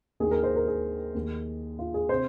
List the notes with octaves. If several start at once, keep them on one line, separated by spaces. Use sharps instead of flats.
D#2 D#3 G#4
A#4
C5
A#4
G#4
D#2 D#3
F4
G#4
C3 C5